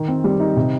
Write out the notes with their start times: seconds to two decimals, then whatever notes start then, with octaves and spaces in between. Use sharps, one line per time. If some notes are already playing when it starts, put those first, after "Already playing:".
Already playing: D#3
0.08 C4
0.24 G3
0.40 D#4
0.57 C3